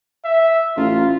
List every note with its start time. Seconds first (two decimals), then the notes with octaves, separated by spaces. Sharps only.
0.24 E5
0.77 A1 F4